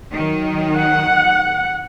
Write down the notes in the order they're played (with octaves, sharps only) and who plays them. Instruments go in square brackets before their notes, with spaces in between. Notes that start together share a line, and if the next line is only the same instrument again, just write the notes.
[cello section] D#3 F#3
[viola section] F#5